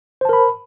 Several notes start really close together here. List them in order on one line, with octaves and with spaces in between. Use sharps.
C5 A5 A#4 B5